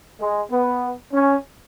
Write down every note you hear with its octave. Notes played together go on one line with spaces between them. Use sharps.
G#3
B3
C#4